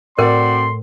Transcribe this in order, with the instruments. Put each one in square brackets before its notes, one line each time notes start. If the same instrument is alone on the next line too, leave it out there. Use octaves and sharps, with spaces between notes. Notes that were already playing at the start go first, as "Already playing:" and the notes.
[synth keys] A2 [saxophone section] C4 F#4 D5 [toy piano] A#4 [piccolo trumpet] C6